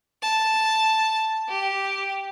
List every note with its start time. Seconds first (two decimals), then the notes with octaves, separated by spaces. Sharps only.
0.22 A5
1.48 G4